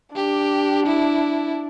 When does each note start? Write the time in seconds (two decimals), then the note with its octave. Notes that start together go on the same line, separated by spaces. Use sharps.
0.15 D4 G4
0.86 E4